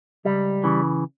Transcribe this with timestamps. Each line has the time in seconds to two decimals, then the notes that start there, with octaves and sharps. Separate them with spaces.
0.25 C#2 G3
0.64 C#3 E3